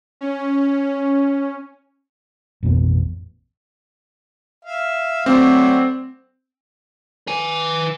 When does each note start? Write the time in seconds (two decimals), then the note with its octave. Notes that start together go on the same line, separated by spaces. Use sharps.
0.21 C#4
2.63 A1 F2 B2 B3
4.65 E5 F5
5.26 F#3 A3 C4 D5
7.27 B4 G#5